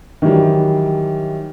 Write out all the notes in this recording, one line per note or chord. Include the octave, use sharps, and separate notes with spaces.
D#3 E3 F#3 G3